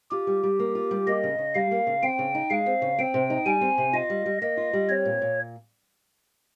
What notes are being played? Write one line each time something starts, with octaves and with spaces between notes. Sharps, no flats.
F4 G4
G3
G3
A#3
F4
G3
A#3 D#5
C#3
C#3
G3 F5
A#3
C#3
C4 G5
C#3
D#4
G#3 F5
C4
C#3
C4 G5
C3
D#4
G3 G#5
C4
C3
F4 D#5
G3
G3
A#3 D#5
F4
G3
C4 C#5
A#2
A#2